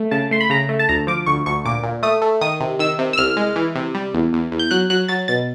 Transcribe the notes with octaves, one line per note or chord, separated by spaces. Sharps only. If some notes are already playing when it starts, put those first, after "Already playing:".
Already playing: A3
C#3 A5
A3 C6
B5
C#3 A#5
A3
A5
D2 A#5
F3 D6
D2 C#6
D2 C#6
A#2 D6
A#2
A3 D#6
A3
D#3 D#6
C3
D#3 E6
C3
E6
C2 F6
G#3
E3
C3
G3
E2
E2
E2
G6
F#3 F#6
F#3 F#6
F#3 A6
B2 A6